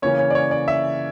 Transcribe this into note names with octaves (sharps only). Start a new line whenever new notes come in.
C#3 E3 A#3 C#4 C#5
C#5
D5
C#5
D5
E5